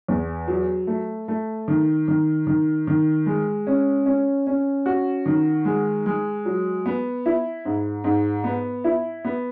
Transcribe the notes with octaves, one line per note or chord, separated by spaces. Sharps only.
E2
F#3
A3
A3
D#3
D#3
D#3
D#3
G#3
C#4
C#4
C#4
F#4
D#3
G#3
G#3
F#3
B3
E4
G#2
G#2
B3
E4
B3